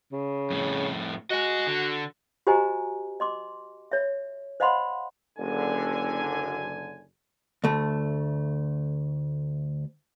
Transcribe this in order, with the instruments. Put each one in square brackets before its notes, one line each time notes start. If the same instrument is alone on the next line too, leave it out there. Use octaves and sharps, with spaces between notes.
[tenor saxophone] C#3
[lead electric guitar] F2 A2
[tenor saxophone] F#4 [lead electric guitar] D#5 G#5
[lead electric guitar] D3
[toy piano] F#4 G4 C5 D#5 G#5 A#5
D#5 C6 D6
C#5 E5
C5 D#5 F5 F#5 B5 C6
[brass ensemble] F#1 D3 G#5
[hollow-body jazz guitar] D2 A3